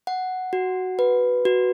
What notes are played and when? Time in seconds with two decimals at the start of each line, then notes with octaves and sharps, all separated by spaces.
0.07 F#5
0.53 F#4
0.99 B4
1.45 F#4